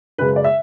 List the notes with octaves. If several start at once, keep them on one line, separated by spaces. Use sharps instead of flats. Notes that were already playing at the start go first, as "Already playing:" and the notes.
F#2 C#3 G#3 B4
D5
E5